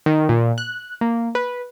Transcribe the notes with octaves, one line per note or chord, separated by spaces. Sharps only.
D#3
A#2
F#6
A#3
B4